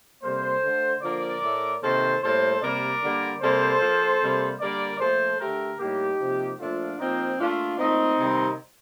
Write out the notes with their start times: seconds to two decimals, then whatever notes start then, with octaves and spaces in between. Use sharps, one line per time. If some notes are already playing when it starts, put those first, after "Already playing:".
0.23 C3 G3 A#3 A4 C5
0.63 D3 A3
1.02 D3 F3 A#3 A#4 D5
1.42 A2 A3
1.82 C3 D#3 A#3 A4 C5
2.22 A2 G3 A#3 A4 C5
2.61 C3 G3 A#3 A#4 D5
3.01 D3 G3 A#3
3.41 C3 G3 A#3 A4 C5
3.81 A#2 F3 A#3
4.21 C3 G3 A#3
4.60 D3 G3 A#3 A#4 D5
5.00 A#2 F3 A3 A4 C5
5.40 D3 A3 G4 A#4
5.80 A2 G3 A#3 D#4 G4
6.20 C3 F3 A#3
6.59 A#2 F3 A3 D4 F4
6.99 A#2 F3 A#3 C4 D#4
7.39 A#2 A3 D4 F4
7.79 A#2 A3 C4 D#4
8.19 C3 D#3 G3 A#3